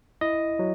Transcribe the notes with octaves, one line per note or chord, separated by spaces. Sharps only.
E4 D#5
F#3